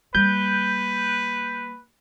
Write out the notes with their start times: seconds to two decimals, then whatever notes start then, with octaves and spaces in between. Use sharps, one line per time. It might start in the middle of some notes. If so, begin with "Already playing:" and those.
0.15 G3 A#3 B4 G6